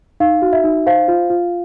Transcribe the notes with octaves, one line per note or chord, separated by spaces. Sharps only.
D#4 F5
F#4
E5
D#4
C5 F5
F4
F4